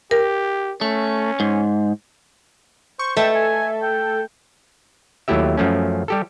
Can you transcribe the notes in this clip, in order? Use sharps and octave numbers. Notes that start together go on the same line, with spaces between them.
G4 A#4
A3 C#4
G#2
C5 C#6
A3 A4 B4 D#5 E5 G5
G#5
G5
D#2 F#3 A3 E4 G4 E5
F#2 F3 A3 C#4
G3 G4 A4